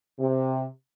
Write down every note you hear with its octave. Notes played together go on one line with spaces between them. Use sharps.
C3